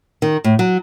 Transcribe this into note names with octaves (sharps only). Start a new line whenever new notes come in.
D#3
A2
F#3